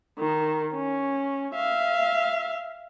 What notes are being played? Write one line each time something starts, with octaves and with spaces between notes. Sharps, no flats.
D#3
C#4
E5 F5